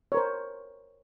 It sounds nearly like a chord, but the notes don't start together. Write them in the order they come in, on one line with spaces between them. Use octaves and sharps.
C#5 A#4 C5